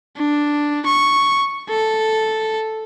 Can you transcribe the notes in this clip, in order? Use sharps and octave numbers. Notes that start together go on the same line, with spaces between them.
D4
C#6
A4